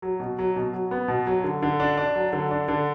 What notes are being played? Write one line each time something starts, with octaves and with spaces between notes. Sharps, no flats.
F#3
B2
F#3
B2
F#3
B3
B2
F#3
D3
D3
D4
D4
F#3
D3
D4
D3